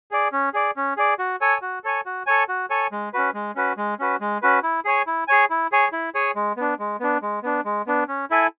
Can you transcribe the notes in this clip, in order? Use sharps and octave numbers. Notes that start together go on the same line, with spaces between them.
G#4 D5
C#4
G#4 D5
C#4
G#4 D5
F#4
A4 C#5 G#5
F#4
A4 C#5 G#5
F#4
A4 C#5 G#5
F#4
A4 C#5 G#5
G#3
C#4 F#4 B4
G#3
C#4 F#4 B4
G#3
C#4 F#4 B4
G#3
C#4 F#4 B4
E4
G#4 C#5 G#5
E4
G#4 C#5 G#5
E4
G#4 C#5 G#5
E4
G#4 C#5 G#5
G#3
B3 D4
G#3
B3 D4
G#3
B3 D4
G#3
B3 D4
C#4
E4 A4 E5 G#5